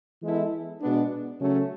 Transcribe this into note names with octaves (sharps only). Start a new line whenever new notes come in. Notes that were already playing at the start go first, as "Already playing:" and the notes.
E3 G#3 B3 E4 A4
B2 G#3 B3 D4
C#3 F#3 A3 C#4